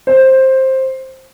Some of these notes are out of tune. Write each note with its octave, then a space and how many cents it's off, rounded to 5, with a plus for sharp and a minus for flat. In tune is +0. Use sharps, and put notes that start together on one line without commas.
C5 +10